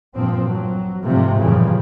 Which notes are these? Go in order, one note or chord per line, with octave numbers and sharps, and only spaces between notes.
G2 A#2 F3 C4
F#3
G#2 C3 F3 G3 A3
F#2 A#2 C#3 E3 F3 G3